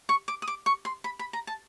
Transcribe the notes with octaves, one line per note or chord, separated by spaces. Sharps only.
C#6
D6
D#6
D6
C#6
C6
B5
B5
A#5
A5